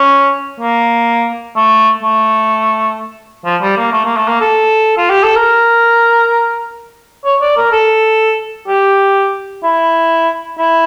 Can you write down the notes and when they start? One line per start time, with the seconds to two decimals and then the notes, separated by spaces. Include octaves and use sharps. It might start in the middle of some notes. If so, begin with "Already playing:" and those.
Already playing: C#4
0.61 A#3
1.56 A3
2.03 A3
3.45 F3
3.62 G3
3.78 A#3
3.93 A3
4.05 A#3
4.17 A3
4.28 A#3
4.41 A4
4.98 F4
5.10 G4
5.24 A4
5.36 A#4
7.25 C#5
7.42 D5
7.57 A#4
7.73 A4
8.68 G4
9.64 E4
10.59 E4